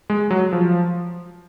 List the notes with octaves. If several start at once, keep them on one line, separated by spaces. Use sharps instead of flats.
G#3
F#3
F3